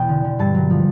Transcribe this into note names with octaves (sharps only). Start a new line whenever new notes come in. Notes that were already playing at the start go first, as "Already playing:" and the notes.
Already playing: E2 B2 B3 G5
D3
D3
G2 A5
F#3
F3